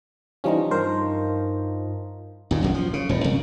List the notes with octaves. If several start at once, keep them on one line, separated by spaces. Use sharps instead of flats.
E3 F3 G3 C#4 D#4 C#6
G2 A#4 C5 A#5
D#2 A#2
B1 F#2 D#3
F3
C#3
E1 A2
C2 F#2